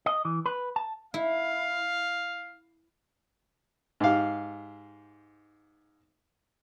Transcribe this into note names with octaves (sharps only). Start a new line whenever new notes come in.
D#5
E3
B4
A5
E4 F5
G#2 G4 F5